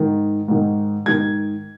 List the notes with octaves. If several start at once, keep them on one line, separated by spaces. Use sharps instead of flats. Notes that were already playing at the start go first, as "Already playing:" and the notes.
Already playing: G#2 D#3
G#2 D#3
G#2 D#3 G#6